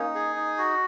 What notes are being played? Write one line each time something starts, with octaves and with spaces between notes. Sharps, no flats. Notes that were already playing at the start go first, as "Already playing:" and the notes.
Already playing: A#3 C#4 D#4
G#4
D#4
F#4